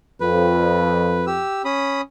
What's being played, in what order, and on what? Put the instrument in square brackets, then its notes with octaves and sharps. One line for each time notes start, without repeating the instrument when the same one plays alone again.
[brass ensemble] F2 [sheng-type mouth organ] B4
[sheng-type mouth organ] G4 E6
C#4 B5 D#6